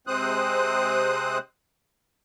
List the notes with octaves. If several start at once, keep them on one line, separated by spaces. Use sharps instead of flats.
C3 G#3 C4 C5 D#6 F#6